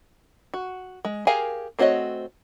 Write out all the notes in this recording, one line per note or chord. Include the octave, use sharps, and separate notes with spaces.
F#4
G#3
G4 G#4 A#4 F5 G#5
A3 C4 F#4 C#5 D#5